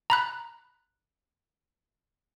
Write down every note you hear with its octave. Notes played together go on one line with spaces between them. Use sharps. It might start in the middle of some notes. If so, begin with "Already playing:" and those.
A#5 B5 F#6